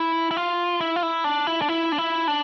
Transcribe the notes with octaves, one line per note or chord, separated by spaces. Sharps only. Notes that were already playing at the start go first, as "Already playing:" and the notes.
Already playing: E4
E4
F4
E4
F4
E4
D4
E4
D4
E4
D4
E4
D4